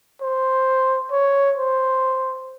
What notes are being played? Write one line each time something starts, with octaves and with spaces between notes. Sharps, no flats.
C5
C#5
C5